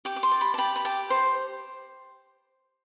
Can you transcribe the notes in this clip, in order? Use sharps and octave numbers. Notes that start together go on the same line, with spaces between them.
G4 D6
D6
C6
D5
B5
A5
G4 B5
B5
G4 A5
C5